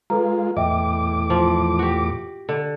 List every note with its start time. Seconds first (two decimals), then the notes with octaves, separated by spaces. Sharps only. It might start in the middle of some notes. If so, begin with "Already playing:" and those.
0.10 G#3 F4 A4 B4 A#5
0.57 E2 A2 D#5 E5 G5 D6
1.30 F3
1.79 F#4 G4
2.49 D3